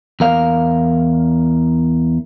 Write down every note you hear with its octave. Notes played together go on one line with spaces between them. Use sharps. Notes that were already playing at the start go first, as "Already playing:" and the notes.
E2 A#4 F5